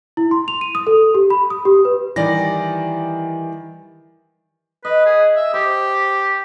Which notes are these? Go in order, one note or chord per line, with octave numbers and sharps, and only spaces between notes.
E4
C6
F7
D#7
D#6
A4
G4
B5
D#6
G4
B4
D#3 E3 G3 D5 A#6
B4 D#5
G#4
E5
G4 C5